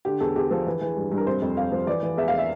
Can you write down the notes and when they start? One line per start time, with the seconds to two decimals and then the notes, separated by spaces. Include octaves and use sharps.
0.05 D3 G4
0.20 E2 A4
0.36 E2 G4
0.51 F3 A4
0.66 E3
0.81 E3
0.97 G2
1.12 G2
1.17 A#4
1.27 C3 C5
1.42 F2
1.57 F2 F5
1.72 F3
1.87 E3 D5
2.03 E3
2.17 E2 E5
2.28 F5
2.38 E5